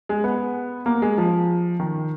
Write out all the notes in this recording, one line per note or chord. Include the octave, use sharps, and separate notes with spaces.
G#3
B3
A#3
G#3
F3
D#3